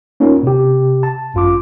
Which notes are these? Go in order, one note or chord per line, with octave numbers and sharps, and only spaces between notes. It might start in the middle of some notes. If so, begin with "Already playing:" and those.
A#3 C#4 D#4 F4 A#4
C3 G4
A5
G#1 F#2 F4 C6 D6